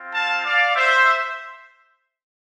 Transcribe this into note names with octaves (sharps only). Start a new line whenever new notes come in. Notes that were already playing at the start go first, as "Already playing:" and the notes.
Already playing: C4 F4
F5 A5
D5 F5
C5 E5